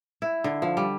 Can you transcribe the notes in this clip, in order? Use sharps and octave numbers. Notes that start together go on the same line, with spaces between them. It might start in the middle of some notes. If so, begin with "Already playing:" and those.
E4
D3
F3
G3